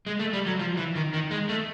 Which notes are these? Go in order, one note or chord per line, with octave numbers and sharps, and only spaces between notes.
G#3
A3
G3
F#3
F3
E3
D#3
D#3
G#3
A3